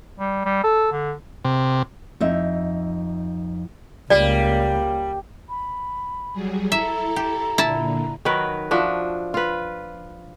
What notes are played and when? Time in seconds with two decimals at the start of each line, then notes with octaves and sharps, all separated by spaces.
0.20 G3
0.45 G3
0.64 A4
0.92 D3
1.44 C3
2.20 F2 D#4 E5
4.10 C#2 G3 A#3 D5
5.49 B5
6.33 F#3 G3 G#4
6.72 E4 A4 E5 A#5
7.16 G4
7.58 A#2 D3 E4 A5
8.25 D#3 F#3 A#4 B4
8.71 F3 D4 F#4 E5
9.34 F4 B4